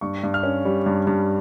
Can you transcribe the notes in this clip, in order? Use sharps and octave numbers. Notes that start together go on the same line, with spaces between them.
G2 C#6
G2
F6
C#4
G3
G2
G2